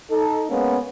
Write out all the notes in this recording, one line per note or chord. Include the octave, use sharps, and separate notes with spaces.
D#4 A4
G#3 A#3 B3 C#4